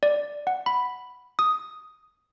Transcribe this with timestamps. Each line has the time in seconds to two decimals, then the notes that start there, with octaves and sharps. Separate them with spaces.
0.03 D5
0.47 F#5
0.66 B5
1.39 D#6